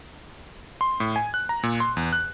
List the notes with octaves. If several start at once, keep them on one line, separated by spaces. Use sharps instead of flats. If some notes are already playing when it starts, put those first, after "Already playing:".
C6
A2
G#5
F#6
A#5
A#2
C6
E2
F#6